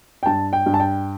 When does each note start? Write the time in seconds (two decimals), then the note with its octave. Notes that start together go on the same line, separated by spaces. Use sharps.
0.23 G5
0.26 G2 A5
0.53 G5
0.66 G2
0.74 A5
0.80 G5